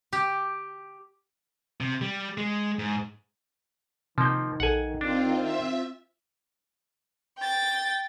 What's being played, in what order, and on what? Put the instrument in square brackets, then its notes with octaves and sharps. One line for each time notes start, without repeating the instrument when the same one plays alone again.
[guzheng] G4
[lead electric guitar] C3
G3
G#3
G#2
[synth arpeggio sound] C3 G6 [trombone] D#3 [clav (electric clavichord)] F3 A#3
[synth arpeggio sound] A#1 A4 [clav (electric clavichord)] F#5 G#5
[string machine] C4 F4 [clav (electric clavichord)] D4
[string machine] E5
[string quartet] G5 A6